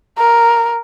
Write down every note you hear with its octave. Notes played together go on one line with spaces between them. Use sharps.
A#4